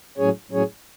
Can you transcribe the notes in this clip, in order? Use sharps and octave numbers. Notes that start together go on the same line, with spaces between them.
A2 F#3 C#4 G#4 C#5
A2 F#3 C#4 G#4 C#5